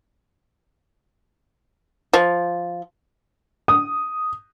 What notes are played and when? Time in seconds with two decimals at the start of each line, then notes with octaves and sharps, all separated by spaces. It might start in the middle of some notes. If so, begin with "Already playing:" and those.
2.13 F3
3.68 D#6